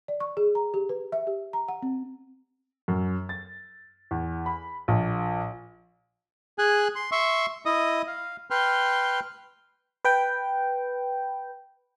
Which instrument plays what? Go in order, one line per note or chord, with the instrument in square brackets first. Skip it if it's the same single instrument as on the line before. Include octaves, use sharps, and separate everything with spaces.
[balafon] D5
C#6
G#4
A#5
G4
B4
E5
G4
A#5
F#5
C4
[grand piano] F#2
A6
E2
B5
A#1
[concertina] G#4 G#5 F#6
C6
E5 C6 C#6
E4 D#5 D#6
F5
B4 G5 C6 F6
[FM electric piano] B4 G5